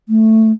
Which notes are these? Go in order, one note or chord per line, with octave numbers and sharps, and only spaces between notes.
A3